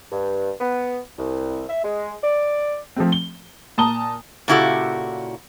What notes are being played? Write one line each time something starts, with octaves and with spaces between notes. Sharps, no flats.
G2
B3
C2
E5
G#3
D5
F3 A3 C4
G7
A#2 A5 A#5 D#6 G7
A#2 C#3 E4 F#4 G4 A4